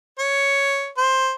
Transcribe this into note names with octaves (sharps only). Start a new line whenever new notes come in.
C#5
C5